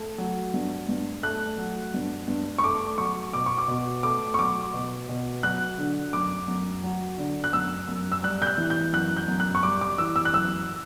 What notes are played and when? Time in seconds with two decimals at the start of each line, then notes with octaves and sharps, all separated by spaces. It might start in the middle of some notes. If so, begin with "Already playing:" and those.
Already playing: A3
0.18 F#3
0.54 G2
0.89 G2
1.23 A3 F#6
1.58 F#3
1.94 G2
2.28 G2
2.58 C#6
2.64 A3 D6
2.98 F#3 C#6
3.33 B2 D6
3.46 C#6
3.58 D6
3.68 B2
4.03 A3 D6
4.34 C#6
4.39 F#3 D6
4.73 B2
5.09 B2
5.43 F#3 F#6
5.79 D3
6.13 F#2 D6
6.48 F#2
6.84 F#3
7.18 D3
7.44 F#6
7.53 F#2 E6
7.88 F#2
8.12 E6
8.24 G3 F#6
8.42 G6
8.47 F#6
8.58 E3
8.70 G6
8.93 F#2 F#6
9.17 G6
9.28 F#2
9.40 F#6
9.55 C#6
9.63 G3 D6
9.81 D6
9.98 E3 E6
10.16 E6
10.25 F#6
10.33 F#2 E6